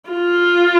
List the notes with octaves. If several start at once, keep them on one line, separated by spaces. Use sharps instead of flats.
F4